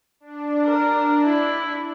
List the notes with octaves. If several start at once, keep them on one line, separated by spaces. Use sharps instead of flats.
D4
A#4
E4